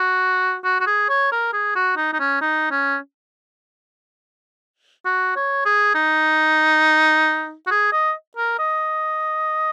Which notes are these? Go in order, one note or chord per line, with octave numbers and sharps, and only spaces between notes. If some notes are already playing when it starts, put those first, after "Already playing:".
Already playing: F#4
F#4
F#4
G#4
C#5
A#4
G#4
F#4
D#4
D#4
C#4
D#4
C#4
F#4
C#5
G#4
D#4
F#4
G#4
D#5
A#4
D#5